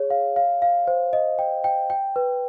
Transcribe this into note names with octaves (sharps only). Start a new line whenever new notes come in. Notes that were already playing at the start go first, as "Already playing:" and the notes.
Already playing: G#4 C#5
F5
F5
F5
C5
D#5
G5
G5
G5
B4